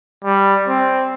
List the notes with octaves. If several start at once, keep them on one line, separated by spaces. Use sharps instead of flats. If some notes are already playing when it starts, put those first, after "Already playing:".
G3
C4